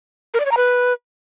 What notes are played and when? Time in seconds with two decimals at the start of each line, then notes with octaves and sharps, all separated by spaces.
0.34 A#4
0.40 D5
0.46 C#5
0.51 A#5
0.57 B4